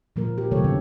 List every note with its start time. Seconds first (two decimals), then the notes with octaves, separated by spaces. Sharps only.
0.16 A#2 F3 A#3 A#4
0.37 E3 G4
0.51 C3 D#3 F#3 A3 A4 C#5
0.64 D3 B3 C4